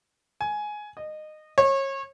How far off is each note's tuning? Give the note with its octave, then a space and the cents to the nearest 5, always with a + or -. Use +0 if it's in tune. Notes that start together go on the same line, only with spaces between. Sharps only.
G#5 +10
D#5 -20
C#5 -30